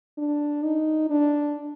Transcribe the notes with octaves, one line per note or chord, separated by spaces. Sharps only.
D4
D#4
D4